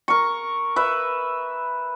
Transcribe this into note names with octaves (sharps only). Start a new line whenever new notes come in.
A#4 C#6
B4 E5